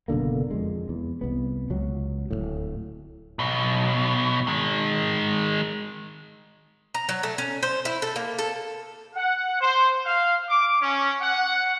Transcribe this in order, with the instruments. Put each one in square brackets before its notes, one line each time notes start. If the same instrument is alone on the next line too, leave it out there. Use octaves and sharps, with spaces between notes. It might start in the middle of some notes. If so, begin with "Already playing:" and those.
[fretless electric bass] F#1 B2 D3 A#3
F2 G#3
E2
C2 B3
C#2 F#3
D1 G#1 A2
[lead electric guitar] B1 B2
D#3 G#3
[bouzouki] A#5
F#3
A3
C#4
C5
E4
A4
A#3
A4
[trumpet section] F#5
C5
F5
D6
C#4
F#5